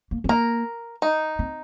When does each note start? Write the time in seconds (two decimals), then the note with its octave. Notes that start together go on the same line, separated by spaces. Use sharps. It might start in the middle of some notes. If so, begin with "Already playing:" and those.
0.11 A#3
0.24 C4
0.29 A#3 A#4
1.02 D#4
1.39 C4